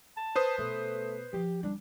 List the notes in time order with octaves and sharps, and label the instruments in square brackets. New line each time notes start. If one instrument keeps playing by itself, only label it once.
[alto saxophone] A5
[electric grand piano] B4 C5 D#6
[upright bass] B2 [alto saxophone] A3
[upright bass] F3 [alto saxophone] G4
[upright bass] G3 C#4 [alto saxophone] D4